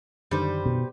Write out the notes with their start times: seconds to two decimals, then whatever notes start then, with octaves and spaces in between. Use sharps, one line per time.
0.31 F#2 D3 D#3 G3 B4 C5
0.66 B2